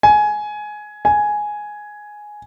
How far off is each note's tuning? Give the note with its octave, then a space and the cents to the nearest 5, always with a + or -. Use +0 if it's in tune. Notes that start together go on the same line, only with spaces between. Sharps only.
G#5 +15
G#5 +5